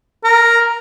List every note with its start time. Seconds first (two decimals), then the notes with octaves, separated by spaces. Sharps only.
0.24 A#4